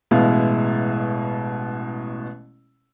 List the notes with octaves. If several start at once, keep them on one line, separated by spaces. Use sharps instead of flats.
A1 B2 G#3 E4 F5